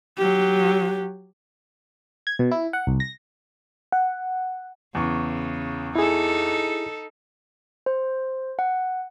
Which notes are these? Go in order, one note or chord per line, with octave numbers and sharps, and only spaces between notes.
F#3 G4
G#6
B2
E4
F#5
C2
A#6
F#5
E2 C#3 C#6
D#4 E4 G#4 A4
C5
F#5